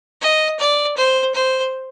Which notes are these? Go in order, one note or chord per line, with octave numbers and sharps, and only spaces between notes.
D#5
D5
C5
C5